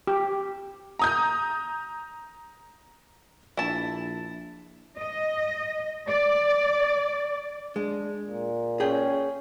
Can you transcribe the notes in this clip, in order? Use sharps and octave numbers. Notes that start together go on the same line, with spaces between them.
G4
A#5 D#6 G6
A#1 E4 A5
D#5
D5
G#3 D4
A#2
C#4 G#4 G5